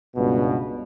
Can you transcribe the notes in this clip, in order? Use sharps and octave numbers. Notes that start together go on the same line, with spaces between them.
C#2 G2 B2